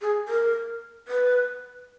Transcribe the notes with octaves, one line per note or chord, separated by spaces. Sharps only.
G#4
A#4
B4